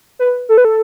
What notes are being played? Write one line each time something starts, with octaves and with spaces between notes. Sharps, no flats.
B4
A4
B4
A4